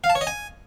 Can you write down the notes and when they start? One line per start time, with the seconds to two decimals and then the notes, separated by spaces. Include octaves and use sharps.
0.04 F5
0.10 A5
0.15 C#5
0.21 D#5
0.27 G#5